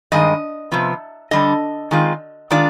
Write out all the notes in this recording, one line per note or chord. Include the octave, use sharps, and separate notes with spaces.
G2 D#3 G#3 D#5
C3 F3 B3
D3 G3 D4 D#5
D#3 G#3 C4 F4
D#3 G#3 D4 F4 D5